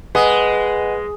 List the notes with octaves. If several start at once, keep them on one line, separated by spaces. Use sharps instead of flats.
G#3 B4 D#5 F#5 G#5 D#6